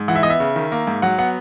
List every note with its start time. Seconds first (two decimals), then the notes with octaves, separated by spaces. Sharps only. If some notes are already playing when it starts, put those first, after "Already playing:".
Already playing: G#2
0.08 E3 F#5
0.16 E5
0.23 B3 D#5
0.30 E5
0.40 C#3
0.56 D#3
0.72 A#3
0.87 G#2
1.02 F#3 F#5
1.18 B3 F#5